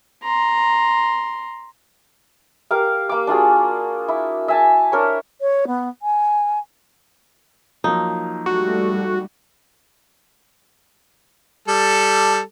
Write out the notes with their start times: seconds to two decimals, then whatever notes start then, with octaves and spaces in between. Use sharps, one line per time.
0.23 A#5 C6
2.71 G4 A#4 F5
3.09 A#3 D6
3.27 D4 F4 F#4 G#4
4.08 E4
4.48 E5 G#5 A5
4.92 D4 A#4 C#5
5.39 C#5
5.67 B3
6.02 G#5
7.84 F3 F#3 A#3 D#4
8.46 G3 A3 F#4
11.68 G3 A4